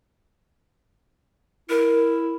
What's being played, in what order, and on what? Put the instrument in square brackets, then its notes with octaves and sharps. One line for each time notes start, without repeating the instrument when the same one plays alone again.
[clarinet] E4 [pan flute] A#4